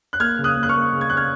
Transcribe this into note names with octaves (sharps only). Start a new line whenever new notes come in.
F#6
A#3 F6 G#6
C#3
D#6 F#6
A#3
F#6
C#6 F6
A#3
C#3
G#6
C#3 F#6
F6 G#6